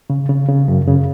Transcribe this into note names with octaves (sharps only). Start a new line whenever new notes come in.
C#3
C#3
C#3
F#2
C#3